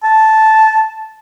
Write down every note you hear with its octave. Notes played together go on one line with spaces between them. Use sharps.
A5